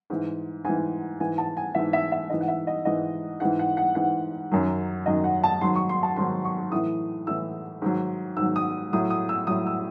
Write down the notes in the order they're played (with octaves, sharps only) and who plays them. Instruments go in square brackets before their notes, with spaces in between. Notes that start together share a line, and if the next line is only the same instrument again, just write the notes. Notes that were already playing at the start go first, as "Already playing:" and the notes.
[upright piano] G#2 E3
G#2 E3 G#5
G#2 E3 G#5
A5
G#5
G#2 E3 E5
E5
E5
G#2 E3 D#5
F#5
E5
D#5
G#2 E3 D#5
G#2 E3 F#5
F#5
F#5
G#2 E3 F#5
F#2 D#3 F#3
F#2 D#3 F#3 D#5
F#5
A5
G#2 D#3 F#3 C6
C#6
C6
A5
G#2 D#3 F#3 C6
C#6
A2 E3 D#6
A2 E3 E6
G#2 D#3 F#3
G#2 D#3 F#3 E6
D#6
A2 F#3 D#6
D#6
E6
A2 F#3 D#6
E6